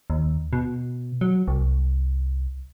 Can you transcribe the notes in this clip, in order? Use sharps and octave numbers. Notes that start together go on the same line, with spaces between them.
D#2
B2
F#3
C2